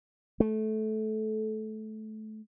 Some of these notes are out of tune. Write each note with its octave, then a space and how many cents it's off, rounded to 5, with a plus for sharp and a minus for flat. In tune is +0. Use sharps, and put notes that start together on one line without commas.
A3 -20